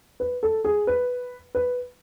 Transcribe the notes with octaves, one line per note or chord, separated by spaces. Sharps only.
B4
A4
G#4
B4
B4